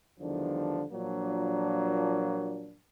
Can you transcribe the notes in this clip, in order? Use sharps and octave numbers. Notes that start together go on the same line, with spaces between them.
E2 D3 D#3 F3 G3 D4
A#2 F3 F#3 A#3 D4